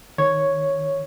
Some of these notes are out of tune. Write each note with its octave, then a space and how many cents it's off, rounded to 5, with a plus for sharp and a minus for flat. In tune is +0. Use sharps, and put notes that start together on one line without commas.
D#3 +10 C#5 +0